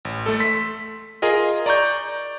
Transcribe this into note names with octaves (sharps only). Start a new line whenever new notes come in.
A1
A3 A4
C6 B6
F4 G#4 A#4 D#5
D5 A#5 C#6 G6